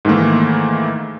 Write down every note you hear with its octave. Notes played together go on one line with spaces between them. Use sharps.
G#2 D#3 E3 A3 A#3